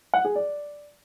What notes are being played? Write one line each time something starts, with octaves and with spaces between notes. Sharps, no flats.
F#5
G#4
D5